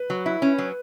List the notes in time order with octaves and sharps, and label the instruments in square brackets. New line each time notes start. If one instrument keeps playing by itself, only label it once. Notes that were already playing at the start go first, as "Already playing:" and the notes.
Already playing: [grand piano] B4
[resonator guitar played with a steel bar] F#3
E4
C#4
F#3